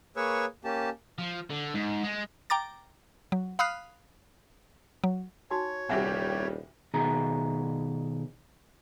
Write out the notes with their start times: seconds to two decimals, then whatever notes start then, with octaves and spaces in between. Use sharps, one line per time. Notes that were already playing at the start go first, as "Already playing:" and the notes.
0.17 A#3 G#4 B4 C#5 C#6 E6
0.64 A#3 C#4 G4 A5
1.18 F3
1.50 D3
1.75 G#2
2.04 G#3
2.50 G5 A#5 D6 A6
3.32 F#3
3.59 F5 B5 D#6 F6 F#6 C7
5.04 F#3
5.51 D#4 F#4 C#5 G#5
5.89 D#1 C2 G3 G4 E5 F#5 G#5
6.94 B2 D#3 G#4 A#5